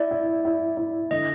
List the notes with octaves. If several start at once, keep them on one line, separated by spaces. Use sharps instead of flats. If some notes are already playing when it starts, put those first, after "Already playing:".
Already playing: E4 D5
E4
E4
E4
D3 D#5